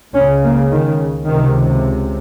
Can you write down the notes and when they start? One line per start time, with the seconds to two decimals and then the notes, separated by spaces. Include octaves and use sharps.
0.15 C#2 C#3 C#4
0.43 A#3
0.71 D#3
1.27 C#2 C3 D#3